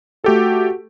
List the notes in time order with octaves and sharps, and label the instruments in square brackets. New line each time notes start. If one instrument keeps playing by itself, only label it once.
[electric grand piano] A3 G4 A4 [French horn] F#4